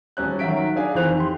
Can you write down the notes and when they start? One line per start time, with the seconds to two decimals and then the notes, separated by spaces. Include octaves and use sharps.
0.17 D#1 C#4 F#6
0.39 D#3 F#3 E5 B6 D7
0.76 D4 G#4 F5 G#5
0.95 F2 D#3 E3 C5 F#6 F7
1.17 G4 C6